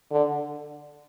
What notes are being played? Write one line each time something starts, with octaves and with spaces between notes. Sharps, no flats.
D3